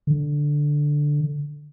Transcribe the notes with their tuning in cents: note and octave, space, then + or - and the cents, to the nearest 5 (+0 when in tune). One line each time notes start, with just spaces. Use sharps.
D3 +0